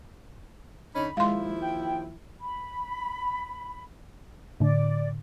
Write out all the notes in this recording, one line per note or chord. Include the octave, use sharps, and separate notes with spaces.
D3 C#4 D#4 B5
D#2 F3 G#3 E4 F5 C6
G5
B5
A2 D3 D5